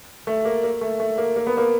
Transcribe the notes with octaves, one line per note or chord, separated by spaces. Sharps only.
A3
A#3
A#3
A3
A3
A#3
A#3
B3
A#3